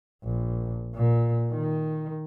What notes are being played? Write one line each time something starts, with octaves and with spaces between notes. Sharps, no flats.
A#1
A#2
D#3